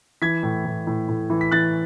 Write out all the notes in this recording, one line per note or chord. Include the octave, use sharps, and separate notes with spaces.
E3 G#6 B6
A2
A2
A2
A2
E3
B6
E3 F#6 A6